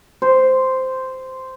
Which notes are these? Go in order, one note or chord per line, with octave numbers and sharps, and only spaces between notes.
C5